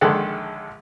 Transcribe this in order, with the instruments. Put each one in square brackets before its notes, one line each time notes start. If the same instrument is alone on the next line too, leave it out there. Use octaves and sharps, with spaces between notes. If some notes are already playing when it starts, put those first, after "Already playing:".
[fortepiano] A#1 D3 D#3 G#3 A4 F#5